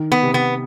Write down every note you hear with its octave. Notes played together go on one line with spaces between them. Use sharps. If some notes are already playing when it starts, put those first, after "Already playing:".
Already playing: D#3
B3
C3
B3